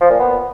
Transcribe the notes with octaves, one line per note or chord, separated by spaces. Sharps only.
F3
A#2
B3